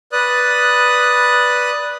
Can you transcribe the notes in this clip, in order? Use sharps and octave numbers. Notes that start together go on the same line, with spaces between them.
B4 D5 D#6 F#6